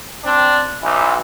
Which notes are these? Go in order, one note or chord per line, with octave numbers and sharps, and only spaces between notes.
C4 D4
B1 E3